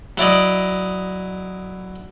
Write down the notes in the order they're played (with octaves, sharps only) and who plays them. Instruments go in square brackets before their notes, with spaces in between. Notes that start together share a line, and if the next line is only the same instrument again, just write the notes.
[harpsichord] F#3 E4 D5 D#5